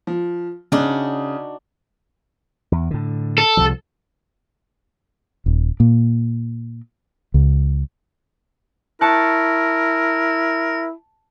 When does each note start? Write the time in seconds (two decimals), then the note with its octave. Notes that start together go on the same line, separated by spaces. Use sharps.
0.07 F3
0.72 C#3 D4 D#4 F#4
2.72 E2
2.91 A2 D3
3.38 A4
3.57 C2 C3 F3
5.46 D#1
5.80 A#2
7.34 C#2
9.01 E4 A#4 A5 C#6 F#6